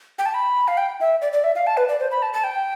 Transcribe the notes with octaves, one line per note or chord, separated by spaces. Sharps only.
G5
A5
B5
F5
G5
E5
D5
D5
E5
F5
A5
B4
D5
C5
B5
A5
A5
G5